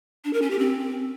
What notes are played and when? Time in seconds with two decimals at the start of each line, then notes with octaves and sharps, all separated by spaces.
0.25 D4
0.33 A#4
0.42 C#4
0.51 G4
0.59 C4